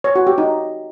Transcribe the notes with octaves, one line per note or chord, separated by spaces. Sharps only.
C#5
F#4
G4
D#4